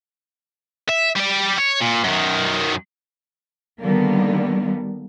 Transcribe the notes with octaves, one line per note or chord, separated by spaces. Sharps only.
E5
G3 D5
C#5
A#2
F#2 D#3
D3 D#3 G3 A#3 B3